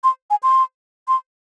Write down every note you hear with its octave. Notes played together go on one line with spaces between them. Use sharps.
C6
G#5
C6
C6